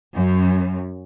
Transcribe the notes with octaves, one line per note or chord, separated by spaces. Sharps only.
F#2